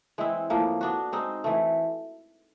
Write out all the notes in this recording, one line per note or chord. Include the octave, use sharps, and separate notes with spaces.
E3 G#3 C4 E4
A2 F3 A#3
B3 D4 F#4
G#3 C4 D#4
E3 A3